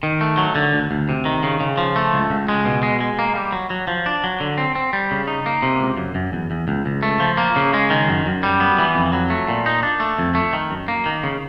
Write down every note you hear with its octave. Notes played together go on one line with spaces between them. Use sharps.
D#3
A3
F#3
D3
D2
D2
C3
D#3
C#3
C#3
F3
A3
C#2
C#2
G#3
B2
G#3
G#3
A#3
G3
F#3
F#3
F3
D4
F#3
D3
C4
C4
G3
C#3
D#4
A#3
C3
C#2
F#2
F#2
E2
E2
C#2
C#2
A3
F3
A#3
C#3
G#3
D#3
F#2
F#2
G3
B3
E3
F2
F#3
A3
A#2
D#4
D4
A3
F2
A3
D#3
F#2
A#3
D#3
C#3